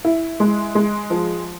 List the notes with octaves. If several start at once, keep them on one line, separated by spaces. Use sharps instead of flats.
E4
G#3
G#3
F3